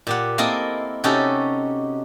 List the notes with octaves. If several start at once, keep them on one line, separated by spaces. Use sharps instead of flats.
A#2 G4 F#5
A#3 C4 E4 A4 A#4 D#5
C3 C#4 D#4 F#4 G4 A4